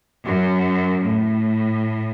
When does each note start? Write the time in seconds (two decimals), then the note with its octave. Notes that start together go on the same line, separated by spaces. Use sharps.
0.25 F#2
1.03 A2